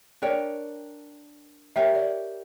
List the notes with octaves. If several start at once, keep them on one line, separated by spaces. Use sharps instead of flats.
D4 A#4 C#5 D5 G5
G4 A#4 C#5 E5
D5